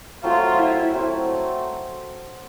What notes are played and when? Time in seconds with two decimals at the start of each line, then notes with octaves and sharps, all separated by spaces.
0.23 F#3 A3 C4 F4
0.58 E4
0.93 F#3 A3 C4